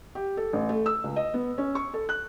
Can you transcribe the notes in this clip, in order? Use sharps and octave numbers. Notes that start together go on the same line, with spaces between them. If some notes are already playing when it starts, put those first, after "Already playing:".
G4
A4
A1
A3
E6
C#2
D#5
B3
C#4
C#6
A4
F#6